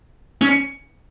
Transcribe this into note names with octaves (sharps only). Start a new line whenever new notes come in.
C#4